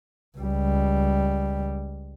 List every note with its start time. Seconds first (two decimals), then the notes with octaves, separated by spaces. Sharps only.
0.38 C#2 G3